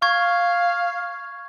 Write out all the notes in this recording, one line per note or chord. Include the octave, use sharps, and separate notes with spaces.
F5 C#6 G#6